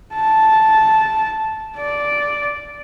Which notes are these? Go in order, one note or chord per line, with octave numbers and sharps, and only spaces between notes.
A5
D5